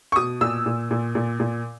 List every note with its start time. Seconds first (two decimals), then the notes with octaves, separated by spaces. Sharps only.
0.12 C#6
0.16 B2 D#6
0.41 A#2 E6
0.66 A#2
0.91 A#2
1.15 A#2
1.40 A#2